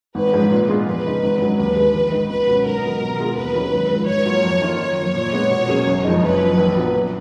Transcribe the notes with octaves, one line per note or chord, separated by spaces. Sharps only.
G#1 B4
G#2 F3 G#3 C#4
A#2
G#3 B3 F4 G#4
F2 B4
C#3 G#3 D#4
G#1
G#2 F#3 C#4
D#2 B4
D#3 G#3
A#1
G#2 D#3
C#2 B4
B2 F#3 C#4
G#2 A#4
D#3 F#3 B3
B2
G#3 B3 F4 G#4
D#2 B4
D#3 F#3 C#4 G#4
G#1
G#2
F3
G#2 C#5
F#3 A#3 F4
F2
D#3 A#3 F4
F#2 C#5
F3 A#3
A#2
G#3 B3
B2
F#3 A#3 C#4 G#4
F#1
F2 F3 G#3 D#4
F#1 B4
F#2 F3
A#1
A#2 F#3 B3
F#2